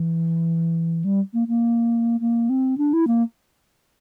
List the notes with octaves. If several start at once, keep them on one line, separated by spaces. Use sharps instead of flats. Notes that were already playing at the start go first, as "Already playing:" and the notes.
Already playing: E3
G3
A#3
A#3
A#3
C4
D4
E4
A#3